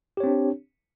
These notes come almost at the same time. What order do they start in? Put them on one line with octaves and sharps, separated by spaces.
G4 C#5 C4 D4